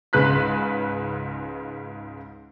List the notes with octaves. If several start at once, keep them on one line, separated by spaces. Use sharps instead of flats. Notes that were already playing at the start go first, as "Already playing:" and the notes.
C#2 G#2 C#3 B4 F#6 B6